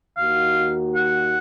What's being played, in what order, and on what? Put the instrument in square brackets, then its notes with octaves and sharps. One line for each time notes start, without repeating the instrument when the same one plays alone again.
[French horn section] D#2 D#3 A#3 D#4 F#4 [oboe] F5
[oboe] F#5